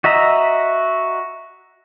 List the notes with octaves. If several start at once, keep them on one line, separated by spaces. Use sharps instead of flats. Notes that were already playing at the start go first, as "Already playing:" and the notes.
F#4 D#5 E5 A#5